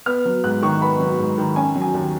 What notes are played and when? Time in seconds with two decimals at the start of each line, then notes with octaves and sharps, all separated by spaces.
0.06 B3 F6
0.26 F#3
0.44 G#2 F#6
0.62 D#3 C#6
0.82 B3 B5
1.00 F#3
1.19 G#2
1.38 D#3
1.56 C#4 G#5
1.76 F#3
1.82 G#5
1.94 D#2